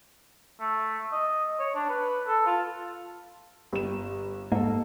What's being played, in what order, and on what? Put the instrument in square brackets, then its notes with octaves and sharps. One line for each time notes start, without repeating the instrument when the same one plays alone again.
[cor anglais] A3
D#5
C#5
D4
B4
A4
F4
[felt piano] G1 E7 [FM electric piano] G4
[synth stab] G#2 [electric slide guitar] A#3 A4